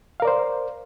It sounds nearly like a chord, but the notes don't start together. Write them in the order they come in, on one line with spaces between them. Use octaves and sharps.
F5 A#4 D5 C5